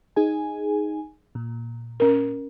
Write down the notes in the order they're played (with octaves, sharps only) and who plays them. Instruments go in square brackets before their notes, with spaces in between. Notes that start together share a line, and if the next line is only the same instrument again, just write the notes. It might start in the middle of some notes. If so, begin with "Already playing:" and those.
[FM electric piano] D#4 G#4 G#5
A#2
[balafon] C#4 A#4